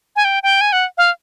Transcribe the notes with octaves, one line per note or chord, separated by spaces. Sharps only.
G#5
G5
G5
G#5
F#5
F5